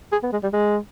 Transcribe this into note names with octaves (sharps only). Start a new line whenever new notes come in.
G#4
B3
G#3
G3
G#3